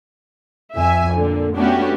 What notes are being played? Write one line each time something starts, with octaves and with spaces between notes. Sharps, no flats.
F2 E5 G#5
A#2 D3
A3 B3 C#4 D4 F#4 G4